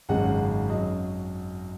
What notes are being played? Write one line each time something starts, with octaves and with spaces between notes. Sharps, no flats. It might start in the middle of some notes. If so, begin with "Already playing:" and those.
G#1 F#2 C#3 G#3 F#5
F#2 F#3 D#5